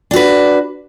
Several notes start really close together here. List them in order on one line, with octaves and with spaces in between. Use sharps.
D4 F#4 B4